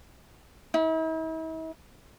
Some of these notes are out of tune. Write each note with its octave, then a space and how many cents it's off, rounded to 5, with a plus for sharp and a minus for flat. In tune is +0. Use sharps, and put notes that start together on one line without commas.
E4 -45